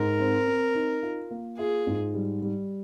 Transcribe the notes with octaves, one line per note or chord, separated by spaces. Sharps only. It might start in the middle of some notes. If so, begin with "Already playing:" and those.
Already playing: G#2 A#4
C4
C4
D#4
F4
A#3
F4 G#4
G#2
G3
G3